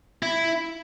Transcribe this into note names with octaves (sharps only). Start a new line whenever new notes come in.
E4